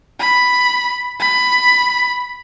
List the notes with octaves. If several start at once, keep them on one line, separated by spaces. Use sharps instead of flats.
B5
B5